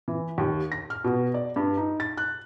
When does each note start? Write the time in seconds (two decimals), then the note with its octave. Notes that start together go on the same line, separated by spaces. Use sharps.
0.08 E3
0.38 D#2
0.72 A#6
0.90 F6
1.04 B2
1.34 D5
1.56 G2
1.77 D#4
2.00 A6
2.18 F#6